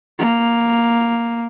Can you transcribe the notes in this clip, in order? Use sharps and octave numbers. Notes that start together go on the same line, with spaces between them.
A#3